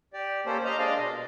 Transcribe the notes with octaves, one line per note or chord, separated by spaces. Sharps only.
G4 D5
A#3 C#4 G4 A4 C5
C5 D#5 F5 A#5
G#3 D4 D5 D#5 F5
B2